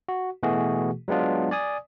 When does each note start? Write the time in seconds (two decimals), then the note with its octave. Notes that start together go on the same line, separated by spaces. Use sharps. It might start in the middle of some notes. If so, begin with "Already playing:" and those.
0.09 F#4
0.43 B2 E3 A3 F#4 G#4
1.08 F#3 G#3 B3 D4 F4
1.51 D5 G#5 D#6